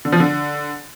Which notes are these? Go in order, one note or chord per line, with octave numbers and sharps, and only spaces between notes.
D3
F3
D3